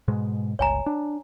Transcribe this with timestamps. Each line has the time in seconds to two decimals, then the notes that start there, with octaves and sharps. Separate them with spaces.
0.08 G#2 B2 G#3
0.59 G1 C#2 C#5 G#5 A#5
0.86 D4